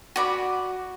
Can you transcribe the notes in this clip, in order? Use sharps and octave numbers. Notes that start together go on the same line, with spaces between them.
F#4 D5 B5